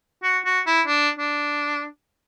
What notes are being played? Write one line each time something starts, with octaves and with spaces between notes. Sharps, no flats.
F#4
F#4
E4
D4
D4